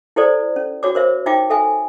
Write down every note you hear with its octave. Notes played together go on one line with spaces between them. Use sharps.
E4 G4 A4 C5 D5
C#4
F#4 C#5 D6
A#4 C5 E5
D#4 F4 E5 G5 D6
A4 E5 G#5